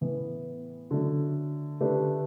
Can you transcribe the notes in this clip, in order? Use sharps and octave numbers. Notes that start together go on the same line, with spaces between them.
A2 E3 B3 E4
D3 F#3 A3
D3 A3 D4 G4 B4